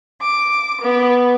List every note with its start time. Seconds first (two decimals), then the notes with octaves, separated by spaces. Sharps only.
0.20 D6
0.81 B3